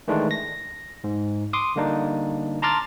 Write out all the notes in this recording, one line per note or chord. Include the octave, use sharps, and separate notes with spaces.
D#3 E3 G#3 A3 D4
A#6
G#2
C6 D6 D#6
D3 G3 A#3 D4 D#4
A5 A#5 C6 D6 F6 A6